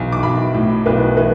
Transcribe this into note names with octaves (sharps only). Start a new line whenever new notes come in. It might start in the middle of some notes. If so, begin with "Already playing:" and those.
Already playing: B1 E3
D6
B1 B5
A2
B1 B4
E3 B4